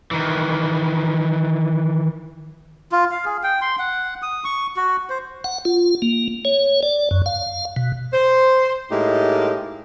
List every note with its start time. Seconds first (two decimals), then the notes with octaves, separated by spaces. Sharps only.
0.11 D#3 E3
2.92 F4
3.11 F5
3.25 G#4
3.43 G5
3.61 C6
3.79 F#5
4.22 D#6
4.44 C#6
4.77 F#4
5.10 C5
5.44 F#5
5.65 F4
6.02 A#3
6.45 C#5
6.83 D5
7.11 F#2
7.26 F5
7.76 B2
8.13 C5
8.91 A2 G#3 A#3 D#4 G4